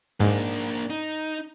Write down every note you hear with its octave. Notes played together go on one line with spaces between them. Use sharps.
G#2 A#3 D4
D#4